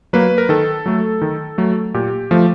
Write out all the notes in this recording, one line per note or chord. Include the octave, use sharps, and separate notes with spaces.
F#3 A#3 B4
A#4
D#3 A4
F#3 A3
D#3
F#3 A3
A#2 G4
F3 A3